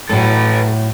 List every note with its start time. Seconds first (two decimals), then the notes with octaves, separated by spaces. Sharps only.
0.09 A2 F#3 A4 B4